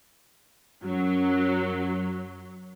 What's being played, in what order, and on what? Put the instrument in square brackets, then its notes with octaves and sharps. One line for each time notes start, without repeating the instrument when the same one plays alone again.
[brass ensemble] F#2 [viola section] F#3